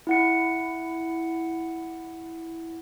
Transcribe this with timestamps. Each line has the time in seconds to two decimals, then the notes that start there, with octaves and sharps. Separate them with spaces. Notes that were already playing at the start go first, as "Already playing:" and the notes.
0.07 E4 F#5 C#7